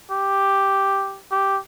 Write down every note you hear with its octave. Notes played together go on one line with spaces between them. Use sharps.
G4
G4